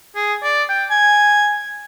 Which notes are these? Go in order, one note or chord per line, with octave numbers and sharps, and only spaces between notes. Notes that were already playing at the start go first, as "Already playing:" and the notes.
G#4
D5
G5
G#5